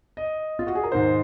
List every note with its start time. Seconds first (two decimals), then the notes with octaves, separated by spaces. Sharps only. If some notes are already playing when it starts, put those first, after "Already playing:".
0.17 D#5
0.59 F4
0.67 F#4
0.75 G#4
0.83 A#4
0.92 G#2 D#3 C5